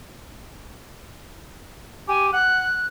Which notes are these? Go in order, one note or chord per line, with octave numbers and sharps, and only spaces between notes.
G4 G#5
F#5 F#6